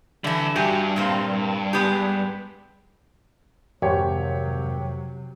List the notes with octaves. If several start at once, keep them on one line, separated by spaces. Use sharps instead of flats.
D3 E3 G3 E5
G2 F#4 G4 G#5
A#2 A#3 C4
G#3 B3 G4
G#1 F2 C3 F#3 G4 C#5